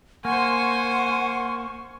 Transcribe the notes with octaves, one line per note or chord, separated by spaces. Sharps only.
A#3 C5 F#5 G#5 C6 C#6